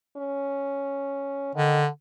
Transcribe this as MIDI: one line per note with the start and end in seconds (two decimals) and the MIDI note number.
0.17 1.55 61
1.55 1.88 50
1.55 1.81 51